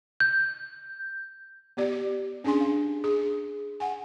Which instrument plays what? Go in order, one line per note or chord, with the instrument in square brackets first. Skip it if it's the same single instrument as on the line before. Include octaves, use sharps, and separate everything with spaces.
[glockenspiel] G6
[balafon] B3 G4 D5
G4
C#4 D4 G#4 G#5 C6
F5
G#4
F#5 G#5